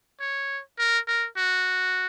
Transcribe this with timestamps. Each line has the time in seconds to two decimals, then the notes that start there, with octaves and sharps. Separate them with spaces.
0.20 C#5
0.79 A#4
1.07 A#4
1.36 F#4